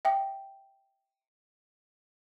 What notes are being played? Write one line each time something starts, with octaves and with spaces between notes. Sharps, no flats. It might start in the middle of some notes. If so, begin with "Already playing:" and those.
E5 G5